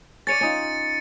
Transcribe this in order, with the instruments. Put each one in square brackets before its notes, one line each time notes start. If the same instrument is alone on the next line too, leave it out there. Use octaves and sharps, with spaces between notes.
[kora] C#4 C#5 D5 [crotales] A6 C#7 D#7
[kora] C#4 D#4 F4